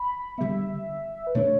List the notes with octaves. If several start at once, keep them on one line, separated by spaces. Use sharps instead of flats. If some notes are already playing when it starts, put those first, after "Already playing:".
Already playing: B5
D3 G3 B3 E5
B4
B2 A3 D4 C#5